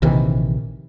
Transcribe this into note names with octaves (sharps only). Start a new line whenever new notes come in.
A#1 C3 D#3 E3